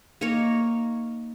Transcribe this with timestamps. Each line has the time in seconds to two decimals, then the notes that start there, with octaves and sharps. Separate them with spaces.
0.21 A#3 D#4 A#4 C#5